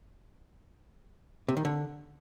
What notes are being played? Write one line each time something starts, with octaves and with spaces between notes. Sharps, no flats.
C3
D#3
D3